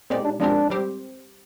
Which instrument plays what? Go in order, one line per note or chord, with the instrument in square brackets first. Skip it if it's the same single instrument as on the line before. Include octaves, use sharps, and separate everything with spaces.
[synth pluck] A#2 G#3 D#4 G4 D5 [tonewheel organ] C4
[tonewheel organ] D4
[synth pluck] F3 G#3 C4 G4 A#4 [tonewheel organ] D4
[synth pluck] G3 C4 G4 C5